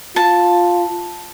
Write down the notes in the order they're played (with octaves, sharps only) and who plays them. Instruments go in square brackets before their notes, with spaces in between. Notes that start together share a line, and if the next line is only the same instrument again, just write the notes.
[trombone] F4 [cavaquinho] A5